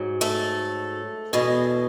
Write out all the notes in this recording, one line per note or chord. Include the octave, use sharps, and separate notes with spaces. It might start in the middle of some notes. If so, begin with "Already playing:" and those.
Already playing: G#2 F#3
A3 A4
E2 B2 G#3